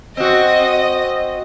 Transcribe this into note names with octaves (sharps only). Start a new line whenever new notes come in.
C4 F#4 D#5